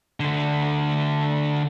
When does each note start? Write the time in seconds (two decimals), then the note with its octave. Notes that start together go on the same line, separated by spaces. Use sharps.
0.20 D3 A3